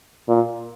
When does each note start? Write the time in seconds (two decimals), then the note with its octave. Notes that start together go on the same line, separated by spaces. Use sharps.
0.28 A#2